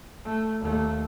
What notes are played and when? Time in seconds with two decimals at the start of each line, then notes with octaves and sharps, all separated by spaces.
0.25 A3
0.61 D#2 A3